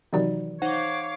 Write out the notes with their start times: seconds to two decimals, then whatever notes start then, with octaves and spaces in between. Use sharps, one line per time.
0.13 C3 D#3 E3 F#3 D5
0.62 D#4 C5 C#5 F5 F#5 D6